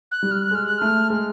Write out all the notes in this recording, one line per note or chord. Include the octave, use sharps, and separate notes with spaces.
F#6
G3
F6
F#6
G#3 F6
F#6
A3 F6
G#3